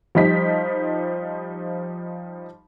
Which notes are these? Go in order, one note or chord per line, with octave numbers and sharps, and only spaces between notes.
F3 G3 D#4 B6